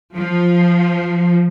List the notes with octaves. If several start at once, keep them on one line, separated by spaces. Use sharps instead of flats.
F3